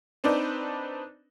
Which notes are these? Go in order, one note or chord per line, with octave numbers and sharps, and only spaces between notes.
C4 D4 D#4 B4 D5